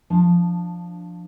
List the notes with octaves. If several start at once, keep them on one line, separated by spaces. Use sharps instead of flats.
F3 D4 A5